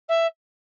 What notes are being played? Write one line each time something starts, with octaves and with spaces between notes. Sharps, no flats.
E5